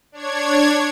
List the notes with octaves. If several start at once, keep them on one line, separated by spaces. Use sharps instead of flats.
D4 C#5 G#6